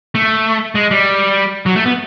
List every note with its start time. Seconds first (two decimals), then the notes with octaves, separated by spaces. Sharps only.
0.15 A3
0.75 G#3
0.91 G3
1.66 F#3
1.76 A3
1.86 B3